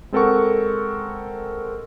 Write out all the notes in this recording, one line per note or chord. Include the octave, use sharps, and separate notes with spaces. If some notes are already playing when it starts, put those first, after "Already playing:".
G#3 C4 A4 A#4 F#5 C#6